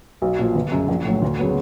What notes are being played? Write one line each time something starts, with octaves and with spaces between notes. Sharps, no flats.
B1
A#2 F3
G1
F#2 C#3
A#1
A2 F#3
D2
C#3 F#3 B3